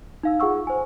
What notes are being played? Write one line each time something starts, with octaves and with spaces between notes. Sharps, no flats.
D#4 F5 E6
F4 G#4 F#5 C#6 E6
C5 G#5